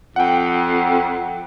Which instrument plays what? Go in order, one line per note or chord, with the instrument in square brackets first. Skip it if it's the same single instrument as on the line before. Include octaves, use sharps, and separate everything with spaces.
[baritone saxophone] F2 [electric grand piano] F#5 G5